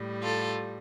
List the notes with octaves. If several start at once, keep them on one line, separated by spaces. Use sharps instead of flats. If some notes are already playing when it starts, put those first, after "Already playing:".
Already playing: A2 G3
F4 A4